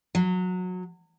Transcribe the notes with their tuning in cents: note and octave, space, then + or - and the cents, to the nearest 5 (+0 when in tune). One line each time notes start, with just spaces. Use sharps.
F#3 -20